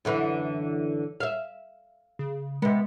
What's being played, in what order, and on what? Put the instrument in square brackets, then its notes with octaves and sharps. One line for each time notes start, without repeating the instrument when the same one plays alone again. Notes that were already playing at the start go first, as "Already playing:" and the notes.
[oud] F#2 D3 E3
E5 F5
[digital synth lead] C#3
[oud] C3 B3 [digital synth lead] G#3